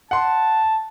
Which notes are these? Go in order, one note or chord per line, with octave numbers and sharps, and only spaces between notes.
F#5 A5 C6